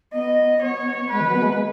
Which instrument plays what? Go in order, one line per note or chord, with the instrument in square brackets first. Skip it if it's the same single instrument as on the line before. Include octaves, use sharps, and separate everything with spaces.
[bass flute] B3 [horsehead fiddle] D#5
[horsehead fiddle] C#5
[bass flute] G#3 [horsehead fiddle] B4
[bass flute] D#3
F#3
B3
G#3
G#3